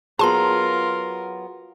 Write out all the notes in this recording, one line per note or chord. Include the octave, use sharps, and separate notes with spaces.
F#3 B3 F4 G#4 A#4 A5 A#5 C6